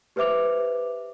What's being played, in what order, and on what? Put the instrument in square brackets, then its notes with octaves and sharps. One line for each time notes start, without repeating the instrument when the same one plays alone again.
[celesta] G4 B4 C5 E5 D6 F7